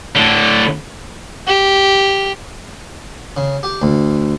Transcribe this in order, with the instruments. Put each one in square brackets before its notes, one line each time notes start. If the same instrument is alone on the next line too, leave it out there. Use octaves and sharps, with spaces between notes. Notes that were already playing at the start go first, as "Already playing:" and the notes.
[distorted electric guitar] A2 D3
[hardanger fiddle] G4
[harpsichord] C#3
G4
D2